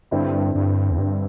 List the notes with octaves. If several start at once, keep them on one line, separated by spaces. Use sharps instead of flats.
G2 D3 C4 E4 C5
G2
E2
G2